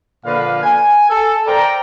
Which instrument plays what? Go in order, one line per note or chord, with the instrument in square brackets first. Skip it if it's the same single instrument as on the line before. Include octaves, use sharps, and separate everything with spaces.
[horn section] A#2 D3 F3 B4 F5
G#5
A4
A#4 C5 D5 G5 A#5